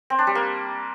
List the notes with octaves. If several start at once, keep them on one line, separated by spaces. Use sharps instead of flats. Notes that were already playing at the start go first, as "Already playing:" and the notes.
C4
D4
G3
A#3